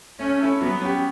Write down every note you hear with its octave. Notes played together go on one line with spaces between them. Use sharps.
A3 C#4
C#4 E4 A4
F#3 B3
C#4 G4